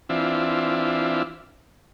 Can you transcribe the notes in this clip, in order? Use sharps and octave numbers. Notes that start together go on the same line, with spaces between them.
E3 C4 D4 E4 F4